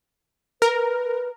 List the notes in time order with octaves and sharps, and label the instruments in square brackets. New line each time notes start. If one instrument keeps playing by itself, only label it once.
[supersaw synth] A#4 [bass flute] B4